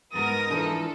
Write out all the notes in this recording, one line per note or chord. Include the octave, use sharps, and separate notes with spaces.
G#2 B3 A#4 D#6 A#6
E3 F3 D4 A4